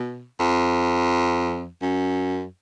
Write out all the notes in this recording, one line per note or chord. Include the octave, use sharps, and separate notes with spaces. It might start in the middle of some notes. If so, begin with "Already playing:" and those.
Already playing: B2
F2
F#2